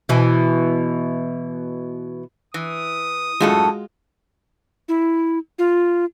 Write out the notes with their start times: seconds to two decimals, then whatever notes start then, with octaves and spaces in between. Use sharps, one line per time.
0.09 B2 E3
2.54 E3 D#6
3.40 F#2 A2 G#3 F4 F#4 A4
4.89 E4
5.59 F4